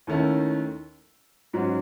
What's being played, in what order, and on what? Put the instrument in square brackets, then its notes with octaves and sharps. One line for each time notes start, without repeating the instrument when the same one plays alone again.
[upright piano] D#2 D#3 A3 C#4 E4
G#2 F#3 C#4 F#4